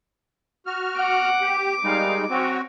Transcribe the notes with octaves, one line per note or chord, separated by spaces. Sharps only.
F#4 F6
F#5 D6
G4
G3 G#3 D#4 A#4 D5 F5
F#3 C4 C#4 F#4